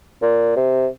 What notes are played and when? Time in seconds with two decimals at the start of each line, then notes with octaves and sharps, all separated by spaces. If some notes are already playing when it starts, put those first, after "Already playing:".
0.22 A#2
0.56 C3